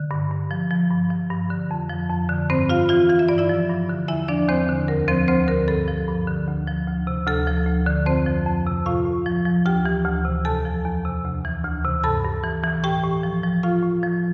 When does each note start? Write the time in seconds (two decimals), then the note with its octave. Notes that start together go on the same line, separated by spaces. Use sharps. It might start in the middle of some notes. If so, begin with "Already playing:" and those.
Already playing: D3
0.11 G2
0.31 G2
0.51 F3
0.71 F3
0.91 G2
1.10 F3
1.31 G2
1.50 D3
1.71 F2
1.90 F3
2.10 F2
2.29 D3
2.49 G2 C4 C5
2.69 G2 F4 F5
2.89 E3 F4 F5
3.09 E3 F5
3.19 E5
3.28 G2 D5
3.38 E4 E5
3.49 F3
3.69 G2
3.89 D3
4.08 E2 E4 E5
4.28 F3 D4 D5
4.49 E2 C4 C5
4.69 D3
4.88 D2 A#4
5.08 F3 C4 C5
5.28 D2 C4 C5
5.48 D3 A#4
5.68 G2 A4
5.88 F3
6.07 G2
6.27 D3
6.48 D2
6.67 F3
6.87 D2
7.07 C3
7.27 D2 A4
7.47 F3
7.67 D2
7.86 D3
8.06 F2 C4 C5
8.26 F3
8.46 F2
8.67 C3
8.86 A2 F4 F5
9.06 A2
9.26 F3
9.45 F3
9.66 D2 G4 G5
9.85 E3
10.05 D2
10.25 C3
10.45 E2 A4 A5
10.65 F3
10.85 E2
11.05 C3
11.25 D2
11.45 E3
11.64 D2
11.84 C3
12.04 G2 A4 A5
12.24 G2
12.44 E3
12.64 E3
12.84 A2 G4 G5
13.04 A2
13.23 F3
13.43 F3
13.63 A2 F4 F5
13.83 A2
14.03 F3